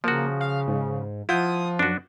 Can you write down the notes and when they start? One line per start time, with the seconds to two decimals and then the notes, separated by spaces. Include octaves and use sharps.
0.04 C#3 F3 A#3 F#4
0.41 F5
0.67 G#2
1.29 F3 E4 F4 F#5 D#6 G6
1.79 F#2 D4 F#4